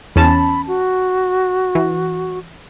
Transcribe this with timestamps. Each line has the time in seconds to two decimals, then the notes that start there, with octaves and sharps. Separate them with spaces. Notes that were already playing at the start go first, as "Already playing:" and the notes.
0.16 E2 C#4 A5 B5
0.68 F#4
1.75 E3